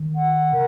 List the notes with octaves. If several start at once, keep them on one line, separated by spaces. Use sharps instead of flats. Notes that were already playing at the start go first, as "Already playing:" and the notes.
Already playing: D#3
F#5
C3 A#4